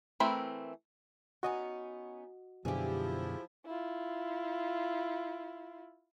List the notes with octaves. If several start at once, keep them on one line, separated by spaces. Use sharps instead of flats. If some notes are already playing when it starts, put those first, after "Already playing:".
E3 A3 C4 A#4 B5
B3 C#4 D#4 F#4 D#5
F#2 B2 D3 F3 E4 G4 G#4
E4 F4